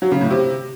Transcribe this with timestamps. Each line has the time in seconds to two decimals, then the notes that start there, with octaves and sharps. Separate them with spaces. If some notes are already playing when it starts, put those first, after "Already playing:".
0.02 F#3
0.11 C#3
0.21 A2
0.31 C3